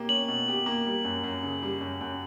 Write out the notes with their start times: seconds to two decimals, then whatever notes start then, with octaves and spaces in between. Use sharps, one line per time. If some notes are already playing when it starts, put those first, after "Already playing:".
Already playing: B2 A#3 G4
0.09 C#4 F#7
0.28 B2
0.48 G4
0.66 A#3
0.86 G3
1.04 F#2
1.23 F#2
1.43 C#3
1.62 G3
1.81 F#2
2.01 F#2